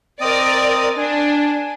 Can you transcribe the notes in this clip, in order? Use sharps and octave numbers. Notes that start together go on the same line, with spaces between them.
C4 A#4 D5 D#5 D#6
D4 G#5